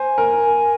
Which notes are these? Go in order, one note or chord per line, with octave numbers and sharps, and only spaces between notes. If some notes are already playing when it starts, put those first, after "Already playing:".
Already playing: C5 G#5
A#4